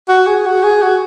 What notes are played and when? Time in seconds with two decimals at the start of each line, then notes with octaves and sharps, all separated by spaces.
0.09 F#4
0.27 G#4
0.46 F#4
0.63 G#4
0.82 F#4